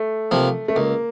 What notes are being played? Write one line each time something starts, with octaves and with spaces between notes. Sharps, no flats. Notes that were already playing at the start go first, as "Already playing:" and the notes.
Already playing: A3
C3 F3 A#3
A3
C#2 A#3